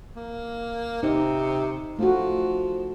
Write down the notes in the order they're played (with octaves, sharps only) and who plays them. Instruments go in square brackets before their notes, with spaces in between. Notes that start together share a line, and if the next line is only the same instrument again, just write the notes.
[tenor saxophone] A#3
[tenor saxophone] C3 [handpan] D#4
[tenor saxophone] F3 [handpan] A3 F#4